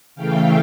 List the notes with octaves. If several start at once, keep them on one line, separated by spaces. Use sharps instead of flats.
C#3 E3 A3 F5 G5